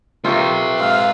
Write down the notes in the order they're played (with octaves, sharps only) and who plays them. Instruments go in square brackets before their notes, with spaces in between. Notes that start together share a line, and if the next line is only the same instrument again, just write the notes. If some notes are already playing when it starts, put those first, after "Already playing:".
[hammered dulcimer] C3 C6 C#6 [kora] F4 G4 A#4 [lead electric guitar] B4 C#5
[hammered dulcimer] G#2 C3 [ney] F5